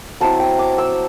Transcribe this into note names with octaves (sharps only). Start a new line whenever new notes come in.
F#3 C4 E4 A5
G5
D6
E6